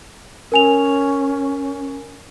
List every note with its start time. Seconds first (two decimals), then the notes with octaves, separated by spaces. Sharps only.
0.52 C#4 A#4 G#5 F7